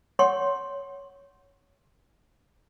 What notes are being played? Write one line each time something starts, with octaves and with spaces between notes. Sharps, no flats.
C#5 F#5 C6 C#6